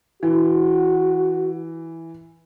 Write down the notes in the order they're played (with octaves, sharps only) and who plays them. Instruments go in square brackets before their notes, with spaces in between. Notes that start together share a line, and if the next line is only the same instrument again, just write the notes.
[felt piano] E3 [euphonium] F#4